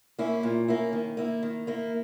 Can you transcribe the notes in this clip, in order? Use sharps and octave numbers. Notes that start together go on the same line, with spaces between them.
A#3 C#4 E4
A#2
A#3 C#4 E4
D#3
A#3 E4
D#3
A#3 E4